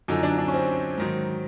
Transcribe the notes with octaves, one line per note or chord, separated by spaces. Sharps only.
F#2 D3 F3 D#4
D4
D4
C#4
C4
G#2 D#3 F#3